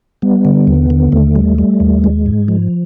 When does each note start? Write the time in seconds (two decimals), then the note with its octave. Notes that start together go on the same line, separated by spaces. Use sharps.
0.22 G3 B3
0.45 D3
0.67 D#2
0.90 D3
1.12 D#2 A3
1.36 G3
1.58 G3
1.80 D#2
2.04 G#3
2.26 G#2
2.48 F3